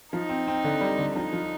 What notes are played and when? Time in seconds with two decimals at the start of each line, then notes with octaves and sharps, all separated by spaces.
0.13 F3 D#4
0.29 C4
0.48 C4
0.64 D3
0.81 G3
0.99 D3
1.15 F3 D#4
1.33 F3